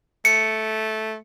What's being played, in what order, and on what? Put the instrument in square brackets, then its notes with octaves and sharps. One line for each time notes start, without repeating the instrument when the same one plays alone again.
[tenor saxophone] A3 [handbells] C#7